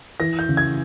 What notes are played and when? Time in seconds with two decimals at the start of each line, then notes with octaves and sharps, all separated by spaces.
0.20 E3 A#6
0.39 G6
0.49 C#3
0.57 G#6